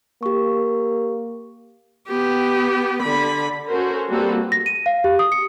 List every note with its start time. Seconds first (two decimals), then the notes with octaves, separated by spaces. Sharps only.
0.23 A#3 G4 C#6
2.09 B3 G4
3.03 D3 B5
3.70 C#4 F#4 A4 A#4 C5
4.10 G3 A#3 C4 F#4 A4 B4
4.52 A#6
4.66 D#7
4.86 F5
5.04 G4
5.19 D#6
5.32 C#7